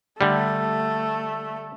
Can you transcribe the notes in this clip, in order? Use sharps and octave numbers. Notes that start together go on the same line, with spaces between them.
D3 G3 A3